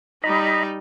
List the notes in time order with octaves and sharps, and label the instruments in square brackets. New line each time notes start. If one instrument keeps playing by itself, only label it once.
[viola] G3 D#4 [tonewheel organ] D#5 A#5 B5